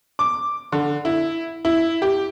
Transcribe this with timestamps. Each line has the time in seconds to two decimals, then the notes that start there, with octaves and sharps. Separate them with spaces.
0.19 D6
0.72 D3
1.05 E4
1.65 E4
2.02 G4